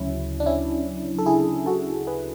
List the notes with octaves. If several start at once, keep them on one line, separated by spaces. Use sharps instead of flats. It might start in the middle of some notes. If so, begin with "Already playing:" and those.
Already playing: D2 C#3 F#3 C#4 E4
D4
C#4 E4
A4
E4 G#4
F#4 A4
G#4 B4